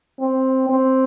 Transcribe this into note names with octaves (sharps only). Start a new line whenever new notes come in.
C4
C4